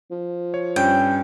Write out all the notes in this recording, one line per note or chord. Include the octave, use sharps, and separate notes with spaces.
F3
C#5
G2 C#4 C#5 G5